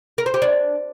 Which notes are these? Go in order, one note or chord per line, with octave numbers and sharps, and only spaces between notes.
A#4
C5
G4
D4